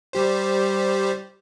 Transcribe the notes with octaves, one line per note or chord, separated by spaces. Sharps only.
G3 G4 C5